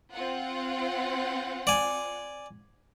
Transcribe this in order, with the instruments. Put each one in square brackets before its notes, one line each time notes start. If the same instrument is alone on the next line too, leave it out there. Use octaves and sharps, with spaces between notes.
[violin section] C4 F4 F#5
[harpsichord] D5 G#5